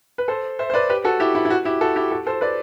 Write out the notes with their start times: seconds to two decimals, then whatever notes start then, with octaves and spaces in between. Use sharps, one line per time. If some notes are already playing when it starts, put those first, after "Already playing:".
0.18 B4
0.28 A4 C5
0.59 C5 E5
0.70 C5
0.74 B4 D5
0.90 G4 B4
1.04 F#4 A4
1.20 E4 G4
1.35 E4
1.45 E4
1.50 F#4
1.65 E4 G4
1.81 F#4 A4
1.96 E4 G4
2.11 F#4 A4
2.27 A4 C5
2.41 B4 D5